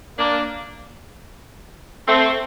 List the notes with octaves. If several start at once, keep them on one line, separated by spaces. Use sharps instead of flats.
A#3 D4
A3 C4